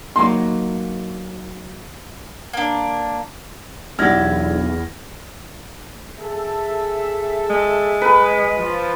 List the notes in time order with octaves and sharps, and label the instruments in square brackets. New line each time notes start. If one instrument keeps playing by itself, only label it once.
[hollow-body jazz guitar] F#3 A#3 D#4 [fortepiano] C6
[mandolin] A#3 D4
[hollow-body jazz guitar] B1 [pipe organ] E2 [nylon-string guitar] D4 E4 G4 [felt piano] F6 G#6 A#6
[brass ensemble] G#4 A4 E5
[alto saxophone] G#3
[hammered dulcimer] B4
[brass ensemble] F3